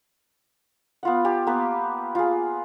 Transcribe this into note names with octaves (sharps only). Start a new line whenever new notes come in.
B3 F4 F#5
G4 A5
A#3 B3 B4
F4 G#4